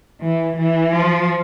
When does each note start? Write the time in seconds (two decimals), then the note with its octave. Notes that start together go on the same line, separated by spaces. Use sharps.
0.21 E3
0.57 E3
0.92 F3